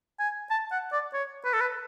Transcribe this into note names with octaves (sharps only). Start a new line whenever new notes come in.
G#5
A5
F#5
D5
C#5
B4
A4
B4